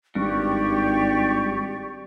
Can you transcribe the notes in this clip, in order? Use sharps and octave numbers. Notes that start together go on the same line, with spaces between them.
G#1 G2 G4 D5 C#6